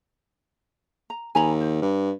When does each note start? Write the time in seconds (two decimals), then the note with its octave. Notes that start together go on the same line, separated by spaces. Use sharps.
1.10 A#5
1.35 D#2 G#5 A#5 B5
1.61 C5
1.82 G2